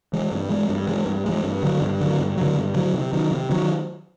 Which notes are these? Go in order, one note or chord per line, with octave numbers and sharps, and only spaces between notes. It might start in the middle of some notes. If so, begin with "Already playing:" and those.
E3 G#3
G2
E3 G#3
G2
E3 G#3
G2
E3 G#3
G2
D3 F#3
G2
D3 F#3
G2
D3 F#3
G2
D3 F#3
C3
D#3 F#3
C3
D#3 F#3